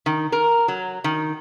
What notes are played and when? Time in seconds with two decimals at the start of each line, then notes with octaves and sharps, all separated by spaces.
0.06 D#3
0.32 A#4
0.68 F#3
1.04 D#3